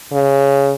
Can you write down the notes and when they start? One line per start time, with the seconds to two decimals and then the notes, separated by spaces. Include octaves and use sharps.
0.13 C#3